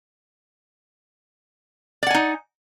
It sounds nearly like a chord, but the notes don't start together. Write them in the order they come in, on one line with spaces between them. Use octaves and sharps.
D5 F#5 G#5 D#4